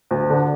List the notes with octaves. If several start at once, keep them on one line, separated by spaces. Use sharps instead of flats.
D2
D3